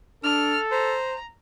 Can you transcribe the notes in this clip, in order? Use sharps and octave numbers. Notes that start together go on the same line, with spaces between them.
D4 A4 F6
C5 A#5